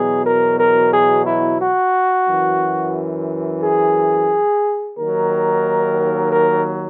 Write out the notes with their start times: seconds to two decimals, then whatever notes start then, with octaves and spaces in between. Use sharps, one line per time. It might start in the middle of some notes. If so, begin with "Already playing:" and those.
Already playing: E2 B2 F#3 G#4
0.26 A#4
0.59 A#4
0.94 G#4
1.27 E4
1.61 F#4
2.28 F#2 E3
3.63 G#4
4.98 D#2 D#3 F#3 A#4
6.32 A#4